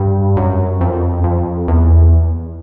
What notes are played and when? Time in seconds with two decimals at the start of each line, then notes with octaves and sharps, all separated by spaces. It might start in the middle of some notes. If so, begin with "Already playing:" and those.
Already playing: G2
0.37 F#2
0.81 F2
1.24 F2
1.68 E2